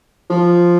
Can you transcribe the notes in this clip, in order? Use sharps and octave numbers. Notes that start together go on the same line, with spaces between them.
F3